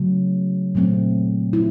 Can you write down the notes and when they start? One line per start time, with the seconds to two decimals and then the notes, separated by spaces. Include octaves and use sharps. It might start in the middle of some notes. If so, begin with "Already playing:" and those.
Already playing: C#3 F#3 A3
0.75 A#2 F#3 A3 C4
1.53 E4